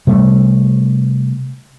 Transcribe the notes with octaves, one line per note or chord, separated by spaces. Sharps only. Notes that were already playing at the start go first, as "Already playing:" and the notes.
C3 G3 A3